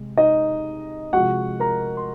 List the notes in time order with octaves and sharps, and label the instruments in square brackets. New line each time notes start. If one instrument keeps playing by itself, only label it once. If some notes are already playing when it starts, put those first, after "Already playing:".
Already playing: [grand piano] C3 G#3
D#4 D#5
C3 F3 G#3 F#4 F#5
A#4 A#5
C6